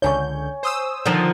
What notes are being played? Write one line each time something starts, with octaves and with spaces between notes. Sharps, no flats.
C#2 D3 C#5 G#5 C#6 G6
C5 D#6 E6
D3 D#3 F3